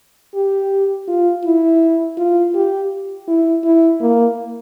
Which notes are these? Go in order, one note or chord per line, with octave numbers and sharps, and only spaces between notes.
G4
F4
E4
F4
G4
E4
E4
A#3